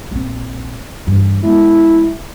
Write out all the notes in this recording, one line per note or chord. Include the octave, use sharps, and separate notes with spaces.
A#1 C4
G2 E3
G#3 B3 E4